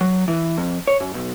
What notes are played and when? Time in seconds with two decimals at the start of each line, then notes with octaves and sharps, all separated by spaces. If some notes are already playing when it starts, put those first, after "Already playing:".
0.01 F#3
0.28 E3
0.58 F2
0.87 C#5
1.00 F#2
1.14 B1